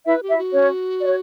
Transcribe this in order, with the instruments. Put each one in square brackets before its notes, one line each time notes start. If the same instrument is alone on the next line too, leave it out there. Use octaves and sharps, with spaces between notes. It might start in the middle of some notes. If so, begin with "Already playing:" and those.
[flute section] E4 E5 [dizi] B4
[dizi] G4
[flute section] E4 E5
[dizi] F#4
[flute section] C#4 C#5
D5
C#5